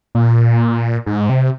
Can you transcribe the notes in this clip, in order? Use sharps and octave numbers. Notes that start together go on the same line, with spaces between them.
A#2
G#2
C3